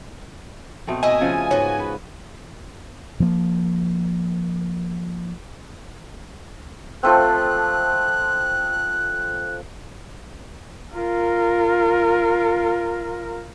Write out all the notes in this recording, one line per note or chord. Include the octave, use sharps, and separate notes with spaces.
B2 A3 C4
E4 D#5 G#5
C#3 F3 F#5
G#2 B3 F#4 C#5
B4
F3 A#3
F3 A3 C4 F#6
F4 A#4